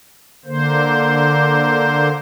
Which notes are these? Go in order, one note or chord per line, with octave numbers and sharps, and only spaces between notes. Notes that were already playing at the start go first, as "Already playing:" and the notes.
D3 A#3 C5